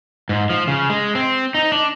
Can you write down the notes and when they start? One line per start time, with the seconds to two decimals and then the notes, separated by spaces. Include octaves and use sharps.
0.29 G#2
0.50 F3
0.67 C#3
0.90 G#3
1.15 C4
1.55 D#4
1.72 D4